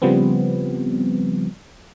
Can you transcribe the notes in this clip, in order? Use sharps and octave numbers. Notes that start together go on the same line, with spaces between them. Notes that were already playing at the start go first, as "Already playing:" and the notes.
C#3 F3 G3 B3 C4